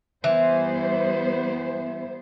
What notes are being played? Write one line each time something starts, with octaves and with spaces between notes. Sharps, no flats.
E3 G3 B3 C5